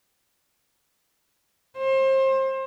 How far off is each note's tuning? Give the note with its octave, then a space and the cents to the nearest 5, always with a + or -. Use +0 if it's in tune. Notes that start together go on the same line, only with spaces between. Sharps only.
C5 +30